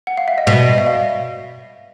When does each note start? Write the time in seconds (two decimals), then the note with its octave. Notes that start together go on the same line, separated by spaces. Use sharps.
0.07 F#5
0.17 F5
0.28 E5
0.38 D#5
0.47 B2 D5
0.66 D#5
0.78 E5
0.86 F5